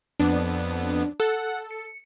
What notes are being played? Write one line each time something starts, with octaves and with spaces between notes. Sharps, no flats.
F2 B3 D4
A4 F#5
C#7